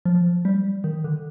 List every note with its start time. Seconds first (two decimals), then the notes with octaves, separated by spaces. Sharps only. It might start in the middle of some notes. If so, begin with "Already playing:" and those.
0.06 F3
0.45 G3
0.84 D#3
1.04 D3